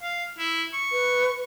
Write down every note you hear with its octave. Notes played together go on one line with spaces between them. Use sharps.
F5
E4
C#6
B4